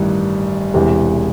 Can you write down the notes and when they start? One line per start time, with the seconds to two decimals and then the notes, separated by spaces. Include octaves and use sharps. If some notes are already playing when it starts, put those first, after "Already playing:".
Already playing: A1 G2 D#3
0.74 E1 E2 C3